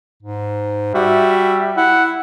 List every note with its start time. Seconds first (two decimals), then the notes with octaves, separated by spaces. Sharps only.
0.22 G#2
0.95 G3 F#4 E5
1.77 E4 F#5